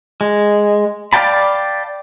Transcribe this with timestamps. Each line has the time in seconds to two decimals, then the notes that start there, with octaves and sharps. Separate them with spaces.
0.21 G#3
1.13 D5 F5 G5 A5 B5